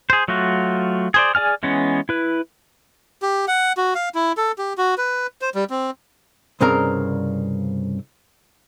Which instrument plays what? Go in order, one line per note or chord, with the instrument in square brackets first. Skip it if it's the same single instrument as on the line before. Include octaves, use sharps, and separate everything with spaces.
[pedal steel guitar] G#4 C5
F#3 A3 F4 F#4
G#4 C5 D5
G#4 D5 G#5 F6
E3 G#3 B3 C#4
E4 B4
[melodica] G4
F#5
F#4
F5
E4
A4
G4
F#4
B4
C5
G3
C4
[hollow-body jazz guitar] C2 G2 C#3 C4 A#4 A#5